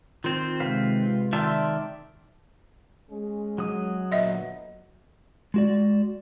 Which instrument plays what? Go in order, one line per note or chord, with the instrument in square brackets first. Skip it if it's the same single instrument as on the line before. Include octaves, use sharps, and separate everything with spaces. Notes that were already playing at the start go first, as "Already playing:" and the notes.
[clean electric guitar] D#3 C4 [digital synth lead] F4
[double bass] C3 G#3 [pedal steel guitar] B4 F5
[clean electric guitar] D#3 [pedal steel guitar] D5 E5 A5 [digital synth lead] C6
[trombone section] G#3 C#4 G#4
[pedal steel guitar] F#3 D#6
[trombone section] A#2 D3 B3 [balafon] D#5 E5
[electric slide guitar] G#3 F#4 D5